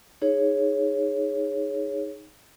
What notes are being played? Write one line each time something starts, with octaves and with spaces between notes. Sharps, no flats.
D#4 G#4 C#5